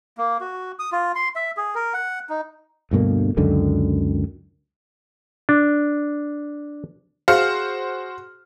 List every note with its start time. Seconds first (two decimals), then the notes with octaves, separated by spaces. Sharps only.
0.18 A#3
0.41 F#4
0.79 D#6
0.92 F4
1.15 C6
1.36 E5
1.57 G#4
1.75 A#4
1.94 F#5
2.30 D#4
2.91 D2 G2 B2 A#3
3.37 C#2 F#2 D3 D#3
5.49 D4
7.28 F#4 G#4 C5 F5 F6